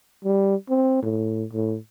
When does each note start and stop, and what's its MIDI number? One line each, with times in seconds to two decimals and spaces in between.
0.25 0.55 55
0.69 1.00 60
1.02 1.45 45
1.53 1.77 45